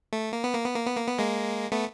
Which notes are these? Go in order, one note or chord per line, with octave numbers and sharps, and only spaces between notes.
A3
A#3
B3
A#3
B3
A#3
B3
A#3
B3
G#3 A#3
A3 B3